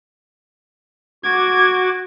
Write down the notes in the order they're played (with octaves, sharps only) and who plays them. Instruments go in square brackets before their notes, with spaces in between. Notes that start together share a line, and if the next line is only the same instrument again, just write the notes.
[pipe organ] F#4 D6 [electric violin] G#6